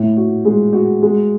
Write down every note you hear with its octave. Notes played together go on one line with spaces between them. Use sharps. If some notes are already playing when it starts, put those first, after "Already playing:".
Already playing: A2
F#4
G#3
F#4
G#3